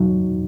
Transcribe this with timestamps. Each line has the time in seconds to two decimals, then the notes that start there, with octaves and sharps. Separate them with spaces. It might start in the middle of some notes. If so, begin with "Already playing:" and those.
Already playing: E2 B2 F#3 D#4